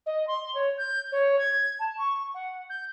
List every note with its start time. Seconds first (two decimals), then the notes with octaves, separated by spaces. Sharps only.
0.06 D#5
0.27 C6
0.55 C#5
0.78 G6
1.12 C#5
1.39 G#6
1.79 A5
1.98 C#6
2.34 F#5
2.70 G6